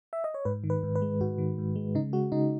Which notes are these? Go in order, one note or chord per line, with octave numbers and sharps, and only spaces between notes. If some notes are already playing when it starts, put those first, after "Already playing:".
E5
D#5
C#5
G#2 B4
D#3
B4
G#2
B4
G#3
G#2 F#4
D#3
G#2
G#3
C#3 D#4
G#3 F#4
C#3 D#4